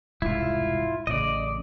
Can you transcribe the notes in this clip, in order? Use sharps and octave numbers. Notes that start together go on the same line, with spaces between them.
E1 C2 G#2 E4 F4
A1 C#3 D5 D#5